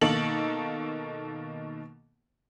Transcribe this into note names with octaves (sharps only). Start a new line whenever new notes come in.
B2 D#3 A#3 A4 F#7